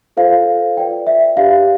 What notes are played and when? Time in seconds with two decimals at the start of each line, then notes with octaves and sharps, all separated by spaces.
0.17 F4 A4 C5 F5
0.77 F4 B4 D5 G5
1.07 E5
1.36 D4 G4 B4 D5 F5